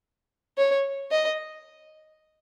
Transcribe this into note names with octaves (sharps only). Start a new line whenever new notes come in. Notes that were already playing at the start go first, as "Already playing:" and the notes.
C#5
D#5